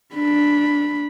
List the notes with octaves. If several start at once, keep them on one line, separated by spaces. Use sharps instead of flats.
D4 B5